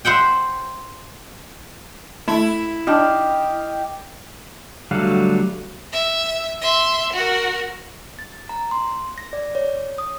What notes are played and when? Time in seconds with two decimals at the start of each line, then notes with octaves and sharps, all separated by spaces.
0.05 C5 E5 F#5 G5
2.28 A3 E4
2.87 D4 D#4 G4 D#5 F5
4.91 D3 F#3 G3 A3 F#4 F5
5.93 E5
6.62 E5 C6
7.13 F#4 A#4
8.19 A6
8.49 A#5
8.71 C6
9.18 A#6
9.33 D5
9.55 C#5
9.98 D#6